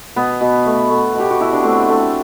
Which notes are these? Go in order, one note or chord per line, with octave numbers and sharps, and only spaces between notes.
B2 B3
B2
A3
A3
B2 G4
F#4
B2 E4
D4
A3 C4
A3